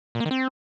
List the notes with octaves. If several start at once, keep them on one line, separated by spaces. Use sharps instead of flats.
A#2
A#3
D#3
C4